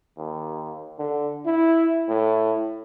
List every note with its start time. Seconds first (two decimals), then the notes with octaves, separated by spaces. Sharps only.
0.17 D#2
0.98 D3
1.46 E4
2.09 A2